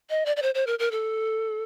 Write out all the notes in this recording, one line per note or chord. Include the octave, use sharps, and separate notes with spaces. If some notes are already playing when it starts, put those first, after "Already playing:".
D#5
D5
D5
C5
C5
A#4
A#4
A4